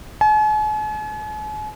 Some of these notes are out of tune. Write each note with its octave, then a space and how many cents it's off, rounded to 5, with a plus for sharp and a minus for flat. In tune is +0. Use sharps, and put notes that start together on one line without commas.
G#5 +45